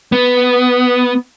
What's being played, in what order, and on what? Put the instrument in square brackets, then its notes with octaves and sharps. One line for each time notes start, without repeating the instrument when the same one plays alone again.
[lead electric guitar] B3